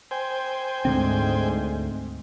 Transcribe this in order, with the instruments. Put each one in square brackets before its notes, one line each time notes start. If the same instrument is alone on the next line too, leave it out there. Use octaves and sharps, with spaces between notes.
[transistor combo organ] C5 G5 G#5
[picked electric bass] D2 D3 C4 [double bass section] G#2